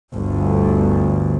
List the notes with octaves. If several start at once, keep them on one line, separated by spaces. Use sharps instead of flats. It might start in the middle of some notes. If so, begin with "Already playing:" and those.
G1 D2 G2